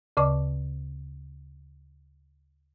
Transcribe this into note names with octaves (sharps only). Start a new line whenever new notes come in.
D2 C#3 D5 A5 C#6 D6